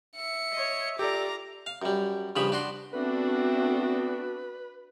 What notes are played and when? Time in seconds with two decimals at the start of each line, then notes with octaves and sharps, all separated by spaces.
0.16 E5 C#7
0.52 C#5 D#5
0.99 F4 G4 A4 D5 A#5 D6
1.66 F5
1.82 F#2 G3
2.36 G2 C#3 F3 B5
2.52 D4 F#4 C6
2.93 A3 B3 C4 D4 F#4 B4